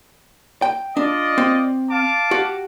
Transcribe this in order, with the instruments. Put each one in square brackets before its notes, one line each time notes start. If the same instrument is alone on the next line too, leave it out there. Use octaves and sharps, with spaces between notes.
[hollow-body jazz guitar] G5
[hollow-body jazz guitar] D4 [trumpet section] F4 D5 D#5
[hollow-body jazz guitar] C4
[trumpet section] F5 A5 D6
[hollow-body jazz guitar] F#4 G4